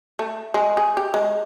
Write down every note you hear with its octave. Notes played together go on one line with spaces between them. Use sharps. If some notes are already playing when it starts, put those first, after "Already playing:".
A3
G#3
G#4
G4
G#3